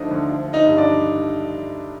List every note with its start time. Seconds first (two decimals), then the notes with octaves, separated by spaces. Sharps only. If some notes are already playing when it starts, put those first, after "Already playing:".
Already playing: D2 D3 F3 D4 D#4 C5 D#5
0.11 D2
0.29 F3
0.47 F3
0.53 D#4 D#5
0.66 G2
0.77 D4 D5
0.83 G2